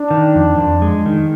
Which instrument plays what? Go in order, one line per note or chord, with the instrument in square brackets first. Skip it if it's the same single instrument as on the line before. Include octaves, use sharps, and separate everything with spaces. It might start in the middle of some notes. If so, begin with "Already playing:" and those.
Already playing: [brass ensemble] D4
[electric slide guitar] D#3
F2
F2
G#3
D#3